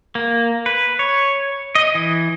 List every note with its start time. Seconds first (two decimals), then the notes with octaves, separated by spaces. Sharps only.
0.15 A#3
0.66 B4
0.99 C#5
1.75 D#5
1.95 E3